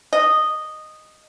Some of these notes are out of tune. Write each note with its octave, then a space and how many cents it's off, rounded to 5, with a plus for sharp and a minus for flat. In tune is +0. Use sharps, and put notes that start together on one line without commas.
D#5 -10